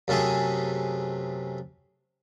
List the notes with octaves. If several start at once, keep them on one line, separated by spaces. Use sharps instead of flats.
F#2 C3 A3 G#4